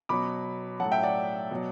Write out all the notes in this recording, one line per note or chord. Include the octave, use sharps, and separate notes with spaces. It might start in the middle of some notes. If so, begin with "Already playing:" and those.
B2 F#3 B5 D6
A2 F#3 F#5 A5
E5 G5
D5 F#5
B2 F#3